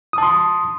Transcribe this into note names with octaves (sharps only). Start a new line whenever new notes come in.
A5 C6 D#6